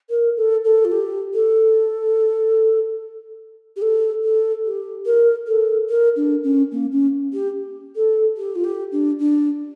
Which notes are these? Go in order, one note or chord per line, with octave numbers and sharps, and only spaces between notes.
A#4
A4
A4
F4
G4
A4
G4
A4
A4
G4
A#4
A4
A#4
D4
C#4
A#3
C#4
G4
A4
G4
F4
G4
D4
D4